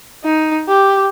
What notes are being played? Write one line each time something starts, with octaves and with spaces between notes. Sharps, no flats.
D#4
G4